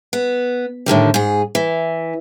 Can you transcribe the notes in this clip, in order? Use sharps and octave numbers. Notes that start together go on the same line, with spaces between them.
B3
A2 D3 D#3 G3
G#2 G#4
E3